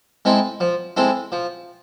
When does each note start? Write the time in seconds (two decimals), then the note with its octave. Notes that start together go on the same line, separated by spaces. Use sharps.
0.25 G#3 C4 E4 A4
0.60 F3
0.97 G#3 C4 E4 A4
1.32 F3